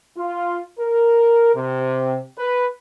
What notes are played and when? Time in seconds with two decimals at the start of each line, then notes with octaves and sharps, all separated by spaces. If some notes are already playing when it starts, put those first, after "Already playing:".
0.16 F4
0.79 A#4
1.54 C3
2.37 B4